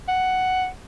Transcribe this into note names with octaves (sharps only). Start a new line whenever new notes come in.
F#5